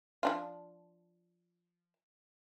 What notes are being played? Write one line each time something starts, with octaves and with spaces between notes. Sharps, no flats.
F3 D4 F4